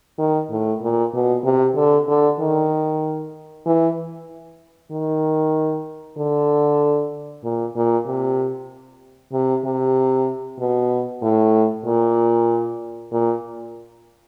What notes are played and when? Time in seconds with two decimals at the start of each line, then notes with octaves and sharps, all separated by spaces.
0.19 D#3
0.50 A2
0.82 A#2
1.14 B2
1.44 C3
1.76 D3
2.08 D3
2.40 D#3
3.66 E3
4.91 D#3
6.17 D3
7.44 A#2
7.75 A#2
8.07 C3
9.33 C3
9.65 C3
10.59 B2
11.22 A2
11.85 A#2
13.12 A#2